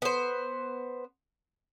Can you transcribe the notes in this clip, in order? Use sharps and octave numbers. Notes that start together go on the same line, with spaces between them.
B3 C5